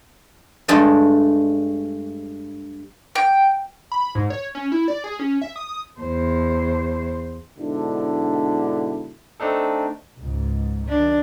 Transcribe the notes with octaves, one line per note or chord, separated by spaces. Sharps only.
G2 G#3 A3 D4 G#5
G5
B5
G#2
C#5
C#4
E4
D5
G#4
C#4
E5
D#6
E2 C5
G#2 B2 D3 D4 E4
A3 C4 D4 D#4 A4
C#2 G#2
D#3 F#3 D4